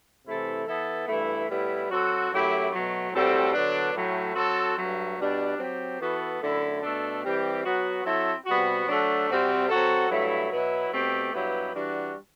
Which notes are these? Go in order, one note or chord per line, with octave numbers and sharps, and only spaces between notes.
C3 E3 A3 E4 A4
E3 B3 E4 A4
G2 E3 A3 E4
A2 G3 B3 E4
F#3 C4 F#4 A4
F#2 F#3 A3 E4 G4
B2 F#3 A3
A2 G3 C4 F#4 A4
D3 F#3 B3 D4
A2 F#3 A3
F#3 C4 F#4 A4
G2 F#3 A3
B2 G3 D4
F#3 C4 G4
E3 B3 F#4 A4
F#2 D3 A3 E4
B2 A3 D4 A4
E3 G3 C4 G4
F#3 B3 F#4
F#3 C4 E4 A4
C3 G3 B3 F#4
F#3 A3 D4 F#4 A4
C3 G3 C4 F#4
F#3 C4 F#4 A4
G2 F#3 A3 E4
B2 F#3 B3 E4
B2 A3 C4 G4
G2 F#3 B3 E4 G4
E3 G3 D4 F#4